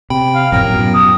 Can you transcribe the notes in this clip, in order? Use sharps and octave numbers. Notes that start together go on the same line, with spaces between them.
C3 G5 B5
F5
G#1 F2 A2 A#4 G5
F#2 B2
D#6